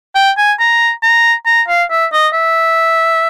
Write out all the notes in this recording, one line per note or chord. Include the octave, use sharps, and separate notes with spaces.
G5
G#5
A#5
A#5
A#5
F5
E5
D#5
E5